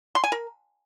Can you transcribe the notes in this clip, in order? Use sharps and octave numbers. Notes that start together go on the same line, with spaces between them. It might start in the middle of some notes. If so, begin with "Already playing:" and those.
C6
G#5
A#4